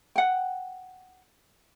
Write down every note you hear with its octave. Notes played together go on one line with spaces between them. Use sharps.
F#5 G5